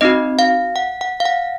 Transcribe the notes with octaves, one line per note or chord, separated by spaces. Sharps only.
C4 D#4 F#4 D#5
F5
F#5
F#5
F5
F#5